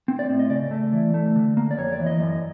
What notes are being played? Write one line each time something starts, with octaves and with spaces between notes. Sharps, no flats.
C4
D5
A2
D#5
C#3 D5
A3
E3
A3
D3
A#3
D5
F2 C#5
D5
E3
D#5
F#2 D#5